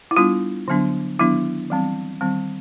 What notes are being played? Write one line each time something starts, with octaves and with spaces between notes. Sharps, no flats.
E4
G3 B3 D4 F4
D3 F#3 B3 D4
D#3 F#3 B3 D4 E4
E3 G3 C4
D#3 G3 C4